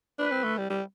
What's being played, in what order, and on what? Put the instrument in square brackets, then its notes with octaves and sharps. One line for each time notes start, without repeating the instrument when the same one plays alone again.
[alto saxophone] D4 [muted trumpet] B4
[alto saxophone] C4
A3
G3
G3